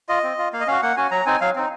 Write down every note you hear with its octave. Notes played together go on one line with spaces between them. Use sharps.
F4 D#5
C4
F4
A#3 F5
D#5
C#4 F#4 F5
A#3 F#5
C#4 F#4 G#5
F#3 A#5
C4 D#4 G#5
F#3 F5
C4 D#4